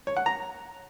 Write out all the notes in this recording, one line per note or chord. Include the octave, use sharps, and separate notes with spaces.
C#5
F#5
A#5